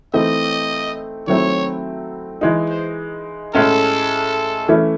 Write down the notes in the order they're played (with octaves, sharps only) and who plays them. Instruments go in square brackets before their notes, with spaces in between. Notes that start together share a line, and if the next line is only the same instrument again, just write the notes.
[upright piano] E3 A3 C4 D#4 [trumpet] D#5
[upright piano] D#3 F#3 A3 C4 E4 [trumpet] C#5
[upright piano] E3 G#3 D#4
[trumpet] C5
[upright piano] A2 G#3 C#4 [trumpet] A4
[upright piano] E3 A3 C#4 E4